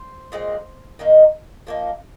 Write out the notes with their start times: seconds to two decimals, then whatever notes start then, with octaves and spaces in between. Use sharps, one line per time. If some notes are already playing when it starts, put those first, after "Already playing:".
Already playing: C5
0.32 A#2 G#3 C4
0.99 D#3 A#3 D#4
1.67 F3 A#3 D#4